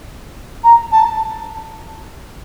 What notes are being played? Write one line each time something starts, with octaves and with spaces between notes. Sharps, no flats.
A#5
A5